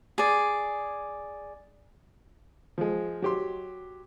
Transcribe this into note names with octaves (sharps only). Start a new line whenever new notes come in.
G#4 D5
F3 G#3
F#3 G4 C6